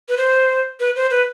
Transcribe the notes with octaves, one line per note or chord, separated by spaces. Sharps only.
B4
C5
B4
C5
B4